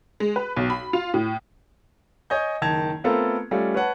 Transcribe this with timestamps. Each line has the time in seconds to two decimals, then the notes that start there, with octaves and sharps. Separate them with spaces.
0.20 G#3
0.36 B4
0.57 B1
0.70 B5
0.93 F4
1.14 A2
2.30 C#5 D#5 G#5 G6
2.62 F#1 D#3 A5 G#6 F7
3.04 A3 B3 C4 F4 A4 A#4
3.51 G3 A3 C#4 F4
3.74 B4 C#5 F#5 A5